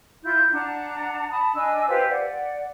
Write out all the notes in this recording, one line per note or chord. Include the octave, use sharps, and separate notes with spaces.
E4 F4 G6
D4 F#5 A5 A#5
A5 B5 D#6
D4 D#5 G#5 E6
F4 G4 B4 C5
D5 F#5